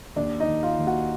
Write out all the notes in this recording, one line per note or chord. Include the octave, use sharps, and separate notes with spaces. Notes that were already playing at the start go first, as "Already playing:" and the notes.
D#2 D4 D5
D#4 D#5
D#3
F4 F5
D#2
F#4 F#5